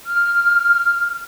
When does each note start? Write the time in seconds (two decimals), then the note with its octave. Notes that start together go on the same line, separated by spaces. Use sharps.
0.06 F6